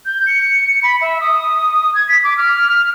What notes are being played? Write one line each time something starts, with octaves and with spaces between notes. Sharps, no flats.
G6
C#7
B5
E5
D#6
G#6
B6
D6
F6